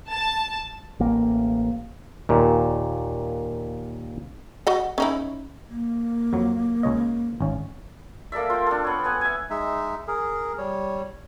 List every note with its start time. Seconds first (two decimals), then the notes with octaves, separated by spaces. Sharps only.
0.10 A5
1.00 A1 A#3
2.29 D#2 A#2
4.67 F#4 D#5 F#5
4.98 C#4 D#4 E4
5.69 A#3
6.33 F2 F#3
6.83 C#2 C#5 D#5
7.41 G#1 C#4
8.32 A#3 A4 D5 E5
8.50 F4 C5 G5
8.66 D4 A4
8.84 B3 C#5
9.04 B3 F#5 G#5 D#6
9.21 E5 G#5
9.50 G#3 D#4 E5
10.07 G#4 A#4
10.58 G3 C#5